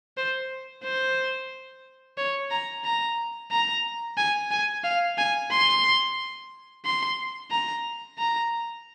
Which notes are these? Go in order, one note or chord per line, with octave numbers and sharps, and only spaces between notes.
C5
C5
C#5
A#5
A#5
A#5
G#5
G#5
F5
G#5
C6
C6
A#5
A#5